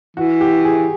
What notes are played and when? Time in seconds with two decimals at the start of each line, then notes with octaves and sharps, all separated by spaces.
0.17 E3 F#4
0.41 G4
0.65 G#4